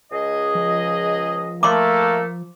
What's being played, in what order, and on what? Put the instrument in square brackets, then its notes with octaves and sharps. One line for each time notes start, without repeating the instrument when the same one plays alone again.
[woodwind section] C#2 G#4 D#5
[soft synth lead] F3
[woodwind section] A3 [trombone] A#3 [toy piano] C6 D6